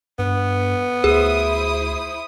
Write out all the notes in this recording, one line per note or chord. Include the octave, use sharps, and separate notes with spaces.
G2 B3
D2 E4 G#4 C5 D#6